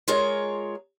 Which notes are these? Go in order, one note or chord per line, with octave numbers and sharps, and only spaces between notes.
G#3 F4 G#4 A#4 C#5